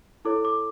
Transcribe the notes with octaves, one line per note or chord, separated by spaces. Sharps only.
E4 A4 C#5 D6
D6